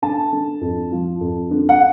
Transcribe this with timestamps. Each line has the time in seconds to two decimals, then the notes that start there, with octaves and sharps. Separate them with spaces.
0.02 D3 A5
0.33 D3
0.61 F2
0.92 F3
1.21 F2
1.51 D3
1.69 F#5